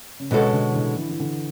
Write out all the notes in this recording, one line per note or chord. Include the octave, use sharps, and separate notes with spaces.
C#3
B2 D3 G#3 C#4 F#4 A4
D3
E3
D3
E3
E3
D3